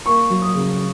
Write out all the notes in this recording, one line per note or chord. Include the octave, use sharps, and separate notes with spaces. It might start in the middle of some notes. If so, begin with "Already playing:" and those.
A#3 C#6
F#3
D#6
C#3